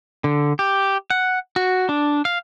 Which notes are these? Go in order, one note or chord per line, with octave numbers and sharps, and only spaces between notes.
D3
G4
F#5
F#4
D4
F5